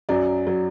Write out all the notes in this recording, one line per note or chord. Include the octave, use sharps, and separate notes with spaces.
F#2 F#3 D5
F#3